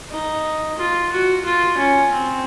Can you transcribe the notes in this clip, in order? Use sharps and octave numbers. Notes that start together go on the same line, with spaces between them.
D#4
F4
F#4
F4
C#4
C4